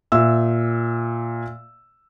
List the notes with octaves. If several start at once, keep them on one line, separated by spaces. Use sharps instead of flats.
A#2 E5 E6